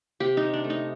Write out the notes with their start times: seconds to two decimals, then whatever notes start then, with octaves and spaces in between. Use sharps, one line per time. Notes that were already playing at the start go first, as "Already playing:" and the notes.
0.20 C3 G4
0.37 D#4
0.42 C3
0.54 D4
0.64 A3
0.70 D#4